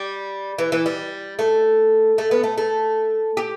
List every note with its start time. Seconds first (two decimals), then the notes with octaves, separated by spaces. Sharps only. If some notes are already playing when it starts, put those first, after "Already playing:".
Already playing: G3
0.58 E3
0.72 E3
0.86 G3
1.39 A3
2.18 A3
2.31 B3
2.43 A3
2.58 A3
3.37 G4